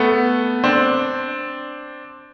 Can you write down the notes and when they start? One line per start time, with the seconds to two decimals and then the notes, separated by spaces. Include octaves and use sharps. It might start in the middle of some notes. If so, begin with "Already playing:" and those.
Already playing: A3 B3
0.64 C4 D4